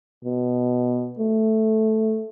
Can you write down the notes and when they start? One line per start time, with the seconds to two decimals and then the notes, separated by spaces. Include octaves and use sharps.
0.25 B2
1.19 A3